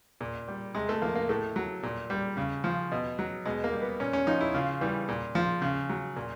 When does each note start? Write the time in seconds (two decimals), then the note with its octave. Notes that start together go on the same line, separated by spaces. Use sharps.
0.21 A#2
0.48 G3
0.75 C3 G#3
0.89 A3
1.02 F3 A#3
1.15 A#3
1.29 A2 A3
1.56 F#3
1.83 A#2
2.10 G3
2.37 C#3
2.64 F3
2.92 B2
3.19 F#3
3.45 B2 G#3
3.64 A#3
3.72 G3
3.82 B3
4.00 A#2 C#4
4.13 C#4
4.27 F3 D#4
4.41 E4
4.54 C#3 F4
4.81 E3 G3
5.09 A#2
5.35 F3
5.62 C#3
5.89 F#3
6.16 A#2